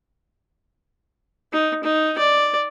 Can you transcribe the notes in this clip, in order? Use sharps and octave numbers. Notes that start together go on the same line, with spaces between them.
D#4
D#4
D5